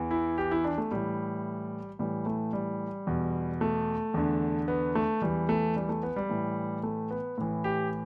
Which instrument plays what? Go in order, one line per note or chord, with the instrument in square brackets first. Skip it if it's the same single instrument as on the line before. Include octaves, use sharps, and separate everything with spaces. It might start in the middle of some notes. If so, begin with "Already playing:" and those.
Already playing: [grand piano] E2 E3
E4
G4
E4
D4
A3
A2 E3 G3
A2 E3 G3
A3
G3
E2 B2
A3
E2 D3
B3
A3
E2 E3 G3
A3
G3
A3
B3
G3
A2 E3
A3
B3
A2 E3
G4